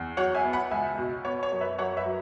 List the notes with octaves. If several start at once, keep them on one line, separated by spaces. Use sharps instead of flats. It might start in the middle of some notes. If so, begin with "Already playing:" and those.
Already playing: E2
F#3 C#5 F#5
E5 G#5
B3
F#5 B5
C#2 E5 G#5
B2
B3 C#5
C#5
F#2
B4 E5
F#2 C#5 F#5
B4 E5
F#3